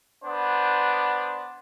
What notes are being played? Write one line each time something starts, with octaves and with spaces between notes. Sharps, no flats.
B3 D4 C5